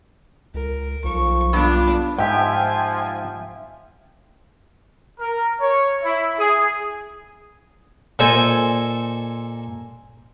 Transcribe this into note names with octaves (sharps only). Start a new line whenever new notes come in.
C#2 A#4
B1 F3 C#6
G2 B3 D4 F4
G#2 F3 G4 E5 G5 G#5
A#4
C#5
E4
G#4
A#2 A4 C5 D#5 G#5